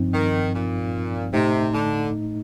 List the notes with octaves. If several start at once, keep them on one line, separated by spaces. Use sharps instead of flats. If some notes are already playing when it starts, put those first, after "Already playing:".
Already playing: G2 F3 C4 D#4
D#3
A#2
A2 C3 A3 D#4
D3